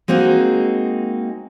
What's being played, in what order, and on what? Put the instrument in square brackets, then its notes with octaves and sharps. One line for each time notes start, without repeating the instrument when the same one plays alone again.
[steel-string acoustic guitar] G#3 A#3 C4 D#4 F#4 G#4